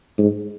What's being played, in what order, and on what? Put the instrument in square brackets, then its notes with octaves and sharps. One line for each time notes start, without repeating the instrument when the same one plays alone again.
[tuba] G#2